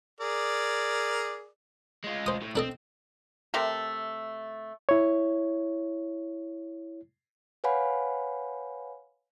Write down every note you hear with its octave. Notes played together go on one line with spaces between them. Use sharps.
G#4 A#4 D5
G#3 F4
C5 D#6
A2
C4 D4 A4 D#5
C3 A3 A4 A#4
E4 C#5
B4 C#5 F5 F#5 G#5 B5